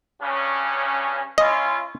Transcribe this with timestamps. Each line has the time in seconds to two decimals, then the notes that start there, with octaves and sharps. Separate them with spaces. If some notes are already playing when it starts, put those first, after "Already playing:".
0.21 G2 C#3 C#4
1.38 C#4 E4 F4 D#5